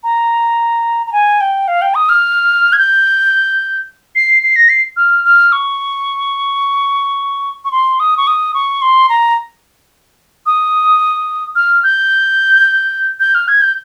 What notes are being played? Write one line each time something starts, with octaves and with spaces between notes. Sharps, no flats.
A#5
A#5
G#5
G5
F5
G5
D#6
F6
G#6
G6
C7
C7
A#6
C7
F6
F6
C#6
C#6
C6
D#6
C#6
D#6
C#6
C6
A#5
D#6
F6
G6
G6
F6
G#6
G6